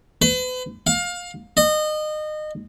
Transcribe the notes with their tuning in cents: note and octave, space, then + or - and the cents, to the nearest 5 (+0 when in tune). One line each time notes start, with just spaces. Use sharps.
B4 +40
F5 +25
D#5 -25